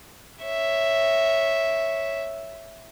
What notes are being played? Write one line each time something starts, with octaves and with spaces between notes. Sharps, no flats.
C#5 E5